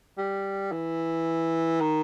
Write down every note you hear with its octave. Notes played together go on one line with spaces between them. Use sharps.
G3
E3
D#3